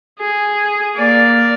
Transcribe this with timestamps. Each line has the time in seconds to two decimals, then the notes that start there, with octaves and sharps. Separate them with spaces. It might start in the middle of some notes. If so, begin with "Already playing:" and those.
0.19 G#4
0.95 A#3 D5